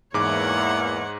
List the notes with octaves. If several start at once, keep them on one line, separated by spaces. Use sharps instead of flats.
E2 G#2 E3 G#3 A#3 C#5 F#5 D6